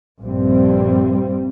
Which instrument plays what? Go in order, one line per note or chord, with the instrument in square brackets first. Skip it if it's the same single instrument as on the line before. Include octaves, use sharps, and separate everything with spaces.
[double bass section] A#1 G2 G3 C4